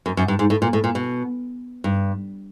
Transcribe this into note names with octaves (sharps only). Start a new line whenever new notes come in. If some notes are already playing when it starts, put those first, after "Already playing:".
F#2
F#2
G2
G#2
A2
A#2
A2
A#2
B2
G2